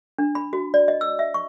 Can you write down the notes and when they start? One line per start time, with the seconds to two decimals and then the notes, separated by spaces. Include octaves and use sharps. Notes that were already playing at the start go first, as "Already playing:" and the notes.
0.18 D4
0.35 B5
0.53 F#4
0.74 D5
0.88 D#5
1.01 E6
1.19 E5
1.34 C#6